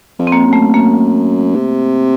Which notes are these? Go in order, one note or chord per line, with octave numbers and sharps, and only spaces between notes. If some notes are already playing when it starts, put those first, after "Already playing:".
F2
C4
A#3
F#2
A3
F#2 A#3
C3